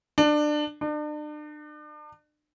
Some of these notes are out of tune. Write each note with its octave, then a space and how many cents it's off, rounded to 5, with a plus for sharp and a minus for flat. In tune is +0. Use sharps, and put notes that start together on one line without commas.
D4 +25
D4 +40